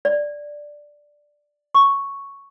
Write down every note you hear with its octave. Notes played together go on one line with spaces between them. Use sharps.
D5
C#6